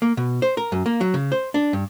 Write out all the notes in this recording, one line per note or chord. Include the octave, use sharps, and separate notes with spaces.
A#3
B2
C5
A#4
F#2
A#3
F#3
C#3
C5
D4
G2